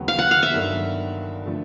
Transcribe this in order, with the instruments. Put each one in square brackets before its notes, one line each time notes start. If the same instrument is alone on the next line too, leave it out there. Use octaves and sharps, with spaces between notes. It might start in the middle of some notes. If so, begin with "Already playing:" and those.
Already playing: [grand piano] D#2 C#3 F#3 B3
[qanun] F5
F#5
F5
E5
[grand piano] G1 G2 D#3 F#3 A#3
D3 F3 A3